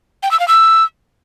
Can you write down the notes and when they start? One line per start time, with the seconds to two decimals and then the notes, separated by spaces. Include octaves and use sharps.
0.23 G5
0.31 E6
0.39 F5
0.48 E6